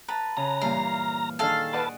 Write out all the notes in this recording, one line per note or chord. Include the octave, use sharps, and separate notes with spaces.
B4 A5 A#5
C#3 A#5
G2 A#2 E3 F5
D#3 D4 G#4 A4 F5
B4 D5 D#5 F#5 A5